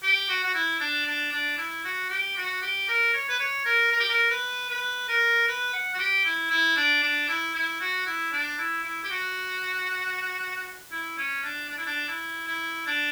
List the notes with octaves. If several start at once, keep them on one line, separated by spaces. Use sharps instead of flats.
G4
F#4
F#4
E4
D4
D4
D4
E4
F#4
G4
F#4
G4
A#4
C#5
B4
C#5
A#4
A#4
G4
A#4
B4
B4
A#4
B4
F#5
F#4
G4
E4
E4
D4
D4
E4
E4
F#4
E4
D4
E4
E4
G4
F#4
E4
C#4
D4
D4
E4
D4
E4
E4
D4